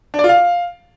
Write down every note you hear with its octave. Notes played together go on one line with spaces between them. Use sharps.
D4
D5
F4
F5